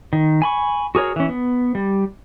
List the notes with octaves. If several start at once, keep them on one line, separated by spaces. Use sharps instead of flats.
D#3
G#5 B5 C#6
F#4 G#4 A#4 C#5
E3 C#4
B3
G3